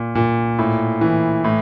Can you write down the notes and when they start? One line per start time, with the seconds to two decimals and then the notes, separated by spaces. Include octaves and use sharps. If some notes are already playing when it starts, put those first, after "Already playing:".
Already playing: A#2
0.15 A#2
0.59 A2
1.01 E3
1.44 A2